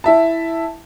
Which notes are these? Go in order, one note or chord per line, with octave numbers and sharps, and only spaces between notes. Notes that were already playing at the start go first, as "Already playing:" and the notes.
E4 E5 A5